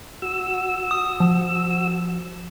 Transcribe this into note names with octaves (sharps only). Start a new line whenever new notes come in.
F#4 E6
D#6
F3